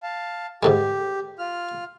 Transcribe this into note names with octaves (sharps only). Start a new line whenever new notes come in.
F5 A5
G#2 D3 G3 G4
F4 F6